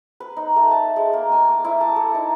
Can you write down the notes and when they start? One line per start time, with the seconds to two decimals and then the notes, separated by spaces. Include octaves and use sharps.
0.20 B4
0.36 D#4
0.56 A3
0.71 A5
0.96 G#3
1.13 A#3
1.32 G#5
1.48 D6
1.65 E4
1.81 A5
1.96 A4
2.15 D#4